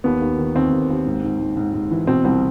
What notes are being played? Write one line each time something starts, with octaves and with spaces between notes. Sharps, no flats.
D#2 B3
D#2
D#3
D#2 C4
D#2
D#2
G#2
G#2
G#2
G#2
G#2
E3
B2 C4
C2 C4